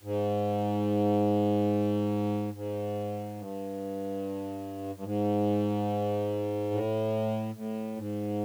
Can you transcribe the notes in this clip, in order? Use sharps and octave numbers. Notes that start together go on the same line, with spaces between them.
G#2
G#2
G2
G2
G#2
A2
A2
G#2